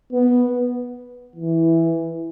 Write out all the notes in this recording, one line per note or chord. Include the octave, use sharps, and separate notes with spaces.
B3
E3